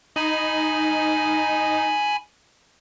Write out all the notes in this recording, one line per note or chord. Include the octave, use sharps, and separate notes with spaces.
D#4 G#5 B5